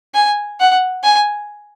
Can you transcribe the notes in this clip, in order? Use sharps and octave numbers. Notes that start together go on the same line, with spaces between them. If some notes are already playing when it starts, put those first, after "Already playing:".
G#5
F#5
G#5